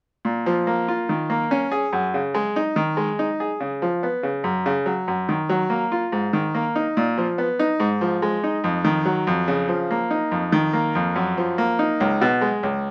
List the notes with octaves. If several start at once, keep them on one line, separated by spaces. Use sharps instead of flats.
A#2
F3
A#3
F4
D#3
A#3
C#4
G#4
F#2
C#3
G#3
D#4
D#3
G#3
D#4
G#4
C#3
F3
B3
C#3
F#2
C#3
F#3
F#2
D#3
F#3
A#3
F4
G#2
D#3
A#3
D#4
A#2
F3
B3
D#4
G#2
F3
G#3
D#4
F2
D#3
F#3
F2
C#3
F3
A#3
D#4
F2
D#3
A#3
F2
F#2
F3
A#3
D#4
C#2
B2
G#3
C#2